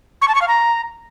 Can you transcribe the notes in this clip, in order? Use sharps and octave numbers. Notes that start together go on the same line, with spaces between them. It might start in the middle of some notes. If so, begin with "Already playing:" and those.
C#6
A5
C#6
F5
A#5